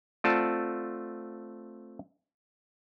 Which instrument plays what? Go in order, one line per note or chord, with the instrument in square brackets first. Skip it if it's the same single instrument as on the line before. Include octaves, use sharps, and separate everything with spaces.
[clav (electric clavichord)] A3 C4 F4 D5 F#5 A5